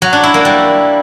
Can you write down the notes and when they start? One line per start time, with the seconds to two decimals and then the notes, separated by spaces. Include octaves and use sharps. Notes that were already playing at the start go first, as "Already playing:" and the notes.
0.02 F#3
0.13 D4
0.23 E4
0.34 A#3
0.45 G3